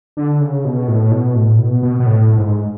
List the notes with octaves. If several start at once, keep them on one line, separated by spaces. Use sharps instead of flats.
D3
C#3
B2
A2
B2
A2
B2
B2
B2
A2
G#2